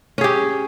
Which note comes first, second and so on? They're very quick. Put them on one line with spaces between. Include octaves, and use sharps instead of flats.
C#4 G#4 G4